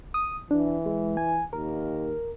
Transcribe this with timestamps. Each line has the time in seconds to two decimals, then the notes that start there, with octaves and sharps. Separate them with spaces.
0.14 D#6
0.51 E3 D4
0.86 G#3
1.17 G#5
1.53 D#2 A#4